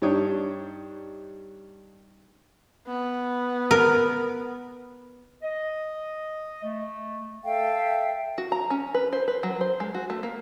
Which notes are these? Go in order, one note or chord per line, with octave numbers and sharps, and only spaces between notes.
G2 D4 D#4 C#5 G5 D#6
B3
A#4
D#5
A3
A4 E5 F5 G5
F#4
A#5
C#4
B4
C5
B4
F#3
C5
G#3
F#4
A3
A#3